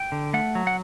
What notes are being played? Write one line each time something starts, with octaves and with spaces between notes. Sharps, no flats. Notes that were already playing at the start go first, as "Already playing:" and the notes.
Already playing: G5
D3
A3 F#5
F#3
F#5